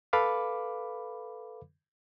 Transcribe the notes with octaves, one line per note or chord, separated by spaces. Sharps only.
A4 B4 F5 B5 D6